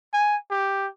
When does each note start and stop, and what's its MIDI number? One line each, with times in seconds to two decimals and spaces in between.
0.13 0.36 80
0.51 0.87 67